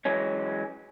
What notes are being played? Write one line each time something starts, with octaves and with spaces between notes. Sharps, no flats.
E3 F#3 G#3 C#4